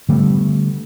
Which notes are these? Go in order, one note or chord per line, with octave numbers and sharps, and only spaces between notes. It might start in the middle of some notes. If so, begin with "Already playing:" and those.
D3 G3 A3 B3